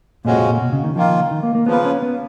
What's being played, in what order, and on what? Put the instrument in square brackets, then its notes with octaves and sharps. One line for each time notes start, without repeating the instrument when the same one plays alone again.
[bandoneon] F2 C#3 G#3 C#4 F#4 [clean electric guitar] A#2
[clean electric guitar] A#2
A#2
B2
C#3
D#3
[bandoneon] D#3 A#3 F4 [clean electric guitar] F3
[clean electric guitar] D#3
A#3
A#3
[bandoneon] C#3 F3 A#3 F4 B4 [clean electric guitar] B3
[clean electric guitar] C#4
B3